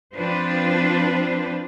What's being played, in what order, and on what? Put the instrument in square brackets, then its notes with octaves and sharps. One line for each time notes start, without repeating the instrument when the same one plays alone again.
[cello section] F3 C4 D4 F4 B4 C5